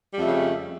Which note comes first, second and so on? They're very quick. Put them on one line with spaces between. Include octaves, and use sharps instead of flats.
G3 F2 A3 C#3